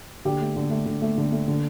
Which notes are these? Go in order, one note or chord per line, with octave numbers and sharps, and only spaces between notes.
D3 G4
A3
D3
A3
D3
A3
D3
A3
D3